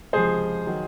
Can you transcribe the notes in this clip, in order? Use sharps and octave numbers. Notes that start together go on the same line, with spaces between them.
C#2 C3 F3 G#4 C5
D#3 F#3